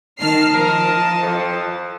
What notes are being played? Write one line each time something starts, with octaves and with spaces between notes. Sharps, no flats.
D#3 D#5 A5 F6 C7
F3 A#4
F2